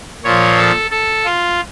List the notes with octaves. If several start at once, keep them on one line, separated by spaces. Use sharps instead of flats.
A#2 F3 C#5
A4
A4
F4